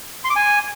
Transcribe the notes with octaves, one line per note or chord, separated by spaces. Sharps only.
C6
D6
G#5